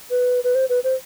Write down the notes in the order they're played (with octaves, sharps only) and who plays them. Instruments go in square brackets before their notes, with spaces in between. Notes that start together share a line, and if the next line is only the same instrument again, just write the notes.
[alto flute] B4
B4
C5
B4
C5